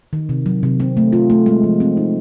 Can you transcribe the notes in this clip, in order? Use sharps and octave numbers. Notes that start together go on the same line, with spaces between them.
D#3
C3
F#3
C3
C4
A3
F4
A3
G#3
F3
C4
D#4